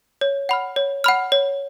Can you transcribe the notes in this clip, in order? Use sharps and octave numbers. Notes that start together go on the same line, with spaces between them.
C#5
F#5 B5 F6
C#5
F#5 B5 F6
C#5